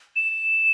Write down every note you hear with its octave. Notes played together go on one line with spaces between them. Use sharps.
E7